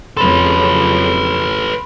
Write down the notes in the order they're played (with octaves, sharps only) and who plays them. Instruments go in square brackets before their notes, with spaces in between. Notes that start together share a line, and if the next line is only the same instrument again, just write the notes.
[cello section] F2 C#3 F#3 [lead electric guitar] A4 B4 [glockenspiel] B5 C6